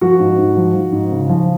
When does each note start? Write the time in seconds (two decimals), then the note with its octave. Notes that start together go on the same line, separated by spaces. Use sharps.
0.01 F3 F#4
0.20 G#2
0.38 G#2
0.57 F3
0.75 F3
0.92 G#2
1.12 C#3
1.29 F3